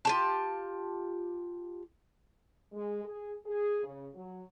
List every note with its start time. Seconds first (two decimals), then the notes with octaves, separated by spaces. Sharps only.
0.05 F4 G4 A5
2.73 G#3
3.04 G#4
3.46 G#4
3.83 C#3
4.14 F#3